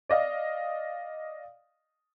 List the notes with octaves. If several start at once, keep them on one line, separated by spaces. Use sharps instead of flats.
D5 D#5 F5